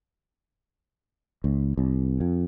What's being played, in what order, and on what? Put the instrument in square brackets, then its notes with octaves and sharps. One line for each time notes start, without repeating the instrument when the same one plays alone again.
[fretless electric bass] C#2
C2
F2